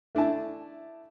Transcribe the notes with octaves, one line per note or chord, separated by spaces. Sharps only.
A3 D4 E4 A5